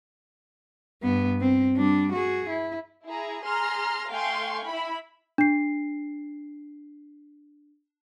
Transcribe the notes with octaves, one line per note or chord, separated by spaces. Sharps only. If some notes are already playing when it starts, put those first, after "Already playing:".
G2 B3
C4
G3 D4
F#4 G#4
E4
E4 G#4 A#5
G#4 A#5 C6 F6
A3 F5 G5 G#5 C6 C#6
E4 B5
D4 C7